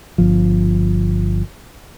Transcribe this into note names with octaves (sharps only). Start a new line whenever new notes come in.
G1 F3